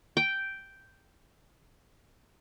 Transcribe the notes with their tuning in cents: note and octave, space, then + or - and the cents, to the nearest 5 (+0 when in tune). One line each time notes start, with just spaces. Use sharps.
G5 -5